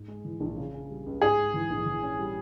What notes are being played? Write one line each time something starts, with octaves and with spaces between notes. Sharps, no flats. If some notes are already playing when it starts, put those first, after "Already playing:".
Already playing: G#2
G#3
E3
A#1
C#3
C#4
G3
C#2
G#2 G#4
G#3
E3
A#1
E3
C#4
G3